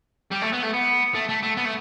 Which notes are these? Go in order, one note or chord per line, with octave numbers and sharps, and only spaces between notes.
G3
A3
B3
A3
B3
A3
A3
A3
B3
A3